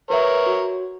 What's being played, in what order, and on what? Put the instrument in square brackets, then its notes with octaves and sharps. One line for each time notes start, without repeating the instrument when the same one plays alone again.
[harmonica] A#4 C#5 [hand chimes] B4 E5
[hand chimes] F#4